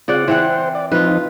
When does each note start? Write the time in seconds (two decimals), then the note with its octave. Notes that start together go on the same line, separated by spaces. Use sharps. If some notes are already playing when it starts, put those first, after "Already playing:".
0.08 C#3 C4 F4 D5 F#5
0.28 E3 C4 C5 F#5
0.75 D5
0.92 F3 C4 D#4 F4 B4